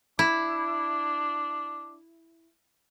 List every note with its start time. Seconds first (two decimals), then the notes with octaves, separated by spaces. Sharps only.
0.19 D4 E4